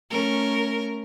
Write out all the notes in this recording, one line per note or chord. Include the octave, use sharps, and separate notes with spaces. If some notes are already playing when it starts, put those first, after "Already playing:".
A3 C#4 A#4